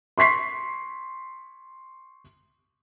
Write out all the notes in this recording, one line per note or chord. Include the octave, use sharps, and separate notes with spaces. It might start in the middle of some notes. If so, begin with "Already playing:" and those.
C6 C#6 B6 C7